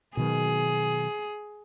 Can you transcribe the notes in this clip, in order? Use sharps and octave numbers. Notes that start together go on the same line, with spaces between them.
B2 D#3 F#3 G#4